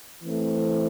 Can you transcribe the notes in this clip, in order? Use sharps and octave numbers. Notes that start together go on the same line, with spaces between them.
E3 A3 C4